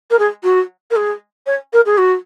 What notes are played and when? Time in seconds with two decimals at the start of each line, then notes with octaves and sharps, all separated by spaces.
0.10 A#4
0.19 G#4
0.43 F#4
0.90 A#4
0.96 G#4
1.46 C#5
1.73 A#4
1.85 G#4
1.97 F#4